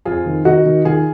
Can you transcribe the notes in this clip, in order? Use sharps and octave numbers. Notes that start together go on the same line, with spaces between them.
F2 F4 G#4
D#3
D#3 D#4 F#4
D#3
D#3 F4 G#4